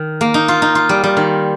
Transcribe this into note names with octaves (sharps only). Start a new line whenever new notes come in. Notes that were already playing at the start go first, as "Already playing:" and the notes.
Already playing: D#3
A#3
D#4
F4
D#4
F4
G3
G3
D#3